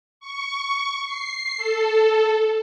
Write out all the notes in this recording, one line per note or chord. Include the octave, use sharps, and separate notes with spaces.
C#6
C7
A4